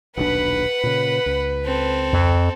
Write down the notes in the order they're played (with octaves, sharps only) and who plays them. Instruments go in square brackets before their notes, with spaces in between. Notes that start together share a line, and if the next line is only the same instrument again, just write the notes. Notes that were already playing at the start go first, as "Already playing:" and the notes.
[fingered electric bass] D#1 B1 D4 [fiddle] B4 [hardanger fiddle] F#5 B5
[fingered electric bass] A#2 C#3
C#2
[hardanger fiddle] C4 A4
[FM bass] F2